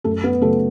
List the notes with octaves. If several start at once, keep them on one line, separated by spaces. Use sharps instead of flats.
F#2 A3 A4
B3 B4
C#3 F#3 A3 A4